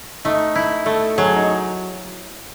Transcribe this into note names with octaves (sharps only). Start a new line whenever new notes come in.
A3 D#4
E4
A3 A4
F#3 G#4
D#4